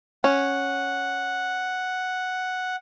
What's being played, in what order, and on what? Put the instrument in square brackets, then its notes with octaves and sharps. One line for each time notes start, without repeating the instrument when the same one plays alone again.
[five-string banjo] C#4 [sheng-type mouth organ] F#5